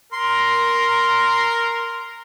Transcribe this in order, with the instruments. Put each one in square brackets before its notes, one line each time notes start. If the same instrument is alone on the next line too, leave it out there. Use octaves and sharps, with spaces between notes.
[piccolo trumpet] A#4 [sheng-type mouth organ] C6